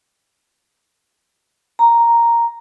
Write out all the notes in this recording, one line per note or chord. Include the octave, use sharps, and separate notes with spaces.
A#5